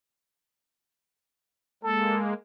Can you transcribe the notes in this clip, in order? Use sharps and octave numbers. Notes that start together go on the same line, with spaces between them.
G#3 A#3 A4